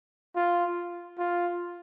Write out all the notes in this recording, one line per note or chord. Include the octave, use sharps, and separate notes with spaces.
F4
F4